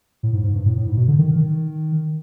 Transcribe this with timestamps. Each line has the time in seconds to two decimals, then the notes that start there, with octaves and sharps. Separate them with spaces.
0.23 A2
0.33 G#2
0.44 G#2
0.55 G2
0.66 A2
0.77 A2
0.87 G#2
0.97 B2
1.08 D3
1.19 D#3
1.36 D#3